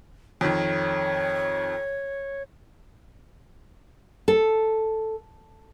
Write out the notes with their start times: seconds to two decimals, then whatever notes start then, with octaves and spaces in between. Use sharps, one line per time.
0.41 F2 D#3 C#5
4.28 A4